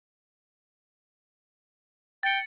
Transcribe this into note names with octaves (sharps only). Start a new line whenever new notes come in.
G5 A6 C#7